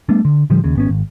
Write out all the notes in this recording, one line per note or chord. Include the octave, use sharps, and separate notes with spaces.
G3 A3 B3 D4
D3
A2 D3 F3 G3
D#2 C#3
G#1 B3 C#4
G#1